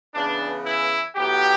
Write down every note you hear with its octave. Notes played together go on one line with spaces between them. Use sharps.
C#3 E3 B3 D4
E4
A2 F#3 B3 G4